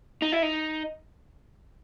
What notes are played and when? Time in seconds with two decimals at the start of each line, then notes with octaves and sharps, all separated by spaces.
0.22 D#4
0.32 E4
0.43 D#4